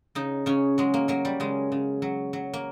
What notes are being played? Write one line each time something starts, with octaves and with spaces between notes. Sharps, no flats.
C#3 D#4
C#3 C#4
F#3 G#3
A#3
F#3 A#3
G3
C#3 G#3
C#3
F#3
F#3
A#3